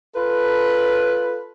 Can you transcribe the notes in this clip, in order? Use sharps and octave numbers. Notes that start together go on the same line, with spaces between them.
F4 A4 B4